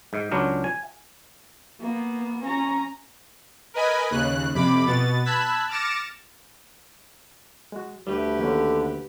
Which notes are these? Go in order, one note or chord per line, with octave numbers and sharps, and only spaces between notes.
G#2
C#2 F#3 D4 A#4
G#5
A#3 B3
C#4 A#5
A#4 B4 D#5 G#5 B5
D#2 C#3 F#6
F2 C3 B5 D6
B2 B3 A6
A5 B5 E6 F#6 G#6 B6
D6 F6 A6 A#6 C#7 E7
G#3 F#4
D2 G3 A3 G4 B4
D3 D#3 A#3 C#4